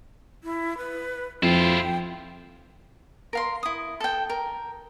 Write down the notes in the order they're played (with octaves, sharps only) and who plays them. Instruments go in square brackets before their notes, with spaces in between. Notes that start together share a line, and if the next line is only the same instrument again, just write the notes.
[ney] E4
B4
[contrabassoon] F2 [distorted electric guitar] E4 F4 [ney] G5
[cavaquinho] A#4 F5 C6
E4 D#6
A4 G5
A#4